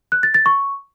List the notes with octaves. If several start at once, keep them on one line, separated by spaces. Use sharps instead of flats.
F#6
A6
A6
C#6